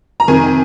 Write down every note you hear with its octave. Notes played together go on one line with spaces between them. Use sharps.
A#5
F2 C3 D#3 G#5